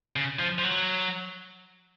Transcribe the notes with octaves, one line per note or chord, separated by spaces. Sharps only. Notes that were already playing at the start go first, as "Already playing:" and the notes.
C#3
F3
F3
F#3